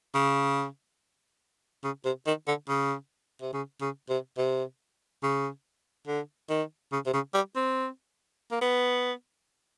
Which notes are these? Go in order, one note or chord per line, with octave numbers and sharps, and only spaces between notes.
C#3
C#3
C3
D#3
D3
C#3
C3
C#3
C#3
C3
C3
C#3
D3
D#3
C#3
C3
C#3
G3
C4
A#3
B3